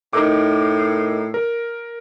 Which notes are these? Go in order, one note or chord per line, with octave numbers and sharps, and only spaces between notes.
A2 D#4 A#4 D6
A#4